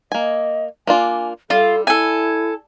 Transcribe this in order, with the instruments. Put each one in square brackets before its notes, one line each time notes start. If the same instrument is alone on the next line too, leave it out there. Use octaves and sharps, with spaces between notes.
[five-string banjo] A#3 G#5 [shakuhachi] D#5
[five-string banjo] A#3 D4 F4 [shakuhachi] G#5
[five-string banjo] G3 [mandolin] F4 [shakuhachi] A4
[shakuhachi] E4 [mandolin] A4 G#5